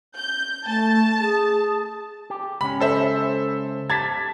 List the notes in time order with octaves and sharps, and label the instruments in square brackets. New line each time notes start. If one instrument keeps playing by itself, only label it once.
[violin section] G6
[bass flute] A3 [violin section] A5
[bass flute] G#4
[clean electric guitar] G4
[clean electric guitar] C#2 C#4 [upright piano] B5
[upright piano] A4 C5 E5
[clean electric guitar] G4 A5 [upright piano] G#6 A6 B6